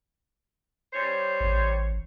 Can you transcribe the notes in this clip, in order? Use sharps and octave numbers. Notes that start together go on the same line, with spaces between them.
G3 C5 C#5
A1